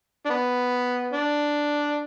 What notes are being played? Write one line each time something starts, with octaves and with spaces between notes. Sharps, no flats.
D4
B3
D4